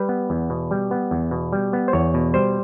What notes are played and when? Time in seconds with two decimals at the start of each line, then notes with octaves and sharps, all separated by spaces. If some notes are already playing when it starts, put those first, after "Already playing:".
Already playing: G3 B4
0.09 B3
0.30 E2
0.50 B2
0.71 G3
0.91 B3
1.11 E2
1.31 B2
1.53 G3
1.73 B3
1.88 C5
1.93 E2 C#5
2.14 B2
2.34 G3 C5